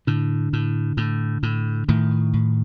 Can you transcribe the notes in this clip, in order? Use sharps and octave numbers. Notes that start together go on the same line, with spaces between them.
A2 D3
A2
A2
A2
A2 D#3
A2